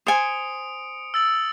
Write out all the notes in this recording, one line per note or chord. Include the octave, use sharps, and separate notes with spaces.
C5 G#5 D#6 C#7 D7
E6 A6 F#7